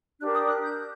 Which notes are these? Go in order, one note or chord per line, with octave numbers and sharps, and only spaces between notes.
D4 G4 A#4 F#6
D#6
F#6
G6